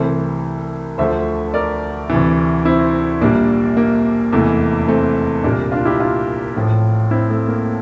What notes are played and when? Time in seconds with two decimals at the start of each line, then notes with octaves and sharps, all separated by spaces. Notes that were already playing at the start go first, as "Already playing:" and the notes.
Already playing: C2 C3 E3 A3 A4 C5
0.98 D2 D3 F3 A3 C5 E5
1.54 A#4 D5
2.10 D2 C3 E3
2.65 C4 E4
3.21 A#1 A#2 G3 A#3 D4
3.77 A#3
4.32 F1 E2 E3 A3
4.88 A3 C4
5.44 C2 A#2 G3 A#3 D4
5.72 D4 F4
5.85 E4 G4
5.99 D4 F4
6.55 A1 A2 F3
7.11 C4 E4
7.30 A3 C4
7.48 A#3